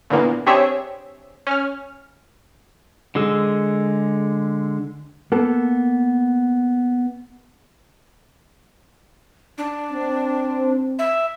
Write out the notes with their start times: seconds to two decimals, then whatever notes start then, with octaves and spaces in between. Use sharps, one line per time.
0.10 A#2 D3 E3 A#3 B3
0.46 C4 D4 G4 G#4 C#5 E5
1.47 C#4 F6
3.15 D3 G#3 G#4 E6
5.32 A#3 B3 A4
9.58 D4
9.93 C4
10.99 E5